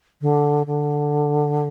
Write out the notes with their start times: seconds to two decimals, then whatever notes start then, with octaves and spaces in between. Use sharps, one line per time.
0.21 D3
0.67 D3